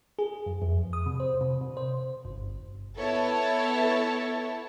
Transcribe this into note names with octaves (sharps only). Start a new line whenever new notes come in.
G#4
F#2
F2
D#6
C3
C5
C3
C3
C5
G1
G1
B3 E4 A4 C#5 A5